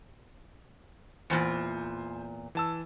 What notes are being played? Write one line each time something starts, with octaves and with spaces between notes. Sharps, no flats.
E2 A#2 C5 G#5 C#7
E3 A5 E6